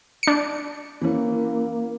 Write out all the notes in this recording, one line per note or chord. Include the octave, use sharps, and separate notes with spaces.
D4 C#7
E3 A#3 C#4